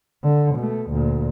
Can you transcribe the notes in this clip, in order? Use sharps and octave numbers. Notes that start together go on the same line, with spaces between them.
D3
B2 A3
D2 A#2